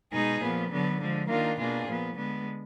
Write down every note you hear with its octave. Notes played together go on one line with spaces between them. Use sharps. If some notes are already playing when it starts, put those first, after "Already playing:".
B2 G#3 D#4 G#4
A#2 F3 B3
D3 F#3 B3
D3 F3 G#3
D#3 A#3 D4 F4
B2 A#3 D4 F4 G#4
A#2 F3 B3
D3 G#3 B3